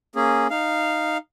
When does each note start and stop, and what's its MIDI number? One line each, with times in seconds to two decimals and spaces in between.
0.15 0.47 58
0.15 0.47 61
0.15 0.47 68
0.50 1.17 63
0.50 1.17 77